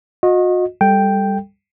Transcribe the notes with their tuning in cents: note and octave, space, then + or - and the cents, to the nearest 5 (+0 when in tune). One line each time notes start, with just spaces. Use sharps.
F#4 -40 D#5 +0
G3 +15 A4 +5 G5 +0